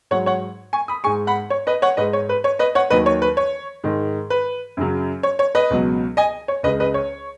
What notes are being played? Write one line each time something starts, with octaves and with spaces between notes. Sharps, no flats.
G#2 F#3 C#5 F#5
C#5 F#5
G#5 C#6
B5 D#6
G#2 G#3 G#5 C#6
F#5 B5
C#5
B4 D#5
C#5 F#5
G#2 G#3 B4 D#5
C#5
B4
C#5
B4 D#5
C#5 F#5
D#2 D#3 F#3 B4 D#5
C#5
B4
C#5
G#2 D#3 G#3
B4
F#2 C#3 F#3
C#5
C#5
B4 D#5
C#2 B2 F#3
D#5 G#5
C#5
C#2 C#3 G#3 B4 D#5
B4 D#5
C#5